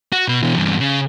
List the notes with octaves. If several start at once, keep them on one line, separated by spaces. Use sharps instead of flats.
F#4
B2 B4
B2 E3
E2 G2
C#3